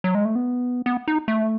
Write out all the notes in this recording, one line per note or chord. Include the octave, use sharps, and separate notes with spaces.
F#3
G#3
A3
B3
B3
D#4
A3